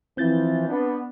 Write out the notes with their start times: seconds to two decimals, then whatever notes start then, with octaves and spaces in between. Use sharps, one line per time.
0.17 E3 F3 C4 G6 A6
0.68 B3 D4